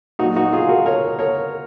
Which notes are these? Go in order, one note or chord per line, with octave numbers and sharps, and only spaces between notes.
A#2 F#3 D#4 F#4
D#4 F#4
F4 G#4
F#4 A#4
A#4 C#5
A#4 C#5